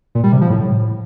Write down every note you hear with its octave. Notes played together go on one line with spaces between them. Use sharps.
A#2
G3
C3
F3
A2